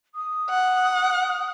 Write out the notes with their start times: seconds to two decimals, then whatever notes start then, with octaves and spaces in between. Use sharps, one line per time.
0.14 D#6
0.50 F#5